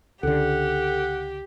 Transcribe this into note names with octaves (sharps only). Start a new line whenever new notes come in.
C#2 D3 G4 A4 F#5